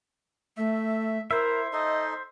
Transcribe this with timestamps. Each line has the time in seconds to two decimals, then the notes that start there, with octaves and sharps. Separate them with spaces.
0.57 A3 E5
1.31 E4 A#4 C5 E5
1.73 D#4 A4 D#5 C6